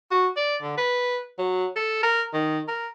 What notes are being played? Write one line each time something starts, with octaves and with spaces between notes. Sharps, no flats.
F#4
D5
D3
B4
F#3
A4
A#4
D#3
A#4